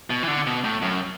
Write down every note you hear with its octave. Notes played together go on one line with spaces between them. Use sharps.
B2
E3
D3
B2
A2
F#2